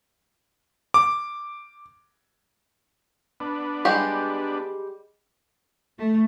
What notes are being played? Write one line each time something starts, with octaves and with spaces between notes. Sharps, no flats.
D6
B3 D4
G3 G#3 G4
A3